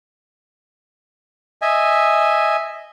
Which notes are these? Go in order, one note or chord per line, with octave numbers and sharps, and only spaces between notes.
D#5 E5 G#5